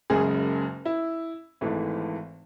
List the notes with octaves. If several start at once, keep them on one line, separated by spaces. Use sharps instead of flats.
F#1 F#2 C#3 G#3 G#4
E4
G#1 G#2 E3 A3